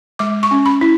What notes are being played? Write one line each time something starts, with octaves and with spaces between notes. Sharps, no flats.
G#3 D6
C#6
C#4
B5
E4